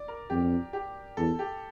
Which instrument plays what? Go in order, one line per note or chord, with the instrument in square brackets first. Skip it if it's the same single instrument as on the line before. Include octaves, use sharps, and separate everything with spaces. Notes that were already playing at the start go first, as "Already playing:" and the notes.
Already playing: [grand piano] D5
A#4
[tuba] F2 [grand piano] G4
[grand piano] G4
[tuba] E2 [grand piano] A4
[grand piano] G4